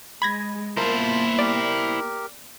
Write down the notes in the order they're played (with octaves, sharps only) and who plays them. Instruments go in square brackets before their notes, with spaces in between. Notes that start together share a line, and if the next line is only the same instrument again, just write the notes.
[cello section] G#3 [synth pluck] B5 G#6 A#6
[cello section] A#3 B3 [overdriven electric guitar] E4 C5 [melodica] F4 A5 [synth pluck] A#4
[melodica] G4 A#4 [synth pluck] D5